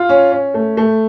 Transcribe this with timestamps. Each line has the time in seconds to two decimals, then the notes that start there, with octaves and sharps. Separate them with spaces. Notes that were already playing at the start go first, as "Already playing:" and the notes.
Already playing: F4
0.09 C#4
0.32 C#4
0.54 A3
0.77 A3